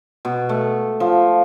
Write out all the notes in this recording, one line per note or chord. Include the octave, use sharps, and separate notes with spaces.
B2
A3
F3